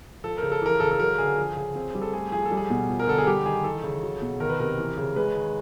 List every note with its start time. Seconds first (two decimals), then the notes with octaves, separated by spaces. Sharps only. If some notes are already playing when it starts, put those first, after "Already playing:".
0.24 F3 A4
0.37 A#4
0.43 C#3
0.52 A4
0.62 E3 A#4
0.80 C#3 A4
0.91 A4
0.99 F#3 A#4
1.18 D3 G#4
1.38 F3
1.57 C#3
1.75 C4
1.95 G3
2.02 A4
2.13 A3 G#4
2.32 F3 G#4
2.45 A4
2.51 G3
2.57 G#4
2.70 B2
2.90 F3
2.99 A#4
3.07 D3 A4
3.18 G#4
3.27 G3 G4
3.45 D#3 G#4
3.64 E3 A4
3.83 C#3
4.03 F#3
4.22 B2
4.40 D#3 A#4
4.50 B4
4.60 C3 A#4
4.78 E3
4.97 C#3
5.16 G#3 B4
5.35 D#3